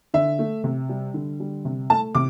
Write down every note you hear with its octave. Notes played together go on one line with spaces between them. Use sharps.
D3 E5
A3
C3
G3
D3
G3
C3
A3 A5
C3 D6